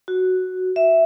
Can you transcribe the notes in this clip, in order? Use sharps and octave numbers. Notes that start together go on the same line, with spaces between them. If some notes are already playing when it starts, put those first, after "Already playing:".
F#4
E5